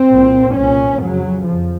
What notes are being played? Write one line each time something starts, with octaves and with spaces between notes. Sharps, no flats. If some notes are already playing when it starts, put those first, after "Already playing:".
Already playing: C4
C2 A#2
C2 A#2 C#4
F2 C#3 F#3
F2 F3